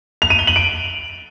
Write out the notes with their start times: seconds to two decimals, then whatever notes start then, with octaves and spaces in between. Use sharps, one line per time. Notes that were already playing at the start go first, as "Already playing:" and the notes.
0.22 F7
0.30 D#7
0.39 G7
0.47 F#7
0.56 D7